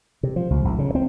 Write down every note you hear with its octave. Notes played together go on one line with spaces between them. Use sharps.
C3
F3
C#2
A#1
C#3
C4